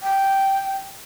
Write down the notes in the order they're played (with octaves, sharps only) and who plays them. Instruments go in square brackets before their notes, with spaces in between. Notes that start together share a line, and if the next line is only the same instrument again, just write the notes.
[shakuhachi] G5